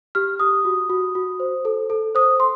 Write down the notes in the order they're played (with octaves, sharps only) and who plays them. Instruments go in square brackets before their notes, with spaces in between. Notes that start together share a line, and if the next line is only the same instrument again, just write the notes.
[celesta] G4 F6
G4 D#6
F#4
F#4
F#4
C5
A4
A4
C5 D#6
C6